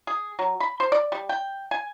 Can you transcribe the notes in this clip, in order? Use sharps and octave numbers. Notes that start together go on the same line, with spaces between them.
G#4
F#3
B5
C5
D5
G3
G5
G#5